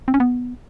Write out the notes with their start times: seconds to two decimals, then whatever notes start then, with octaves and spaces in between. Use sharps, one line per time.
0.08 C4
0.14 C#4
0.20 B3